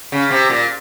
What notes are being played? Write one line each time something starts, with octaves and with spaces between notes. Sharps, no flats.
C#3
C3
A#2